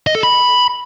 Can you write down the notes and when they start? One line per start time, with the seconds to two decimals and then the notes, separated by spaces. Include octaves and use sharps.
0.07 D#5
0.15 A4
0.23 B5